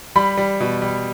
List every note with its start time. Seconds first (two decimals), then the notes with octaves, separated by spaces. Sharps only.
0.16 G3 B5
0.37 G3
0.61 B2
0.82 G3